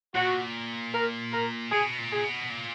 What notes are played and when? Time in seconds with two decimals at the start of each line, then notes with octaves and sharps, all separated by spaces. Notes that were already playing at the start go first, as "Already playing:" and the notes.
0.15 A#2 F#4
0.93 A#4
1.33 A#4
1.72 B2 G#4
1.99 A#2
2.12 G#4
2.24 B2
2.50 A#2